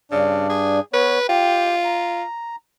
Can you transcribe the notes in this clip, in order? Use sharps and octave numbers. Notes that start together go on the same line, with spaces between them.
G2 C#3 D4
G#4
B3 B4 C#5
F4 G4 G5
A#5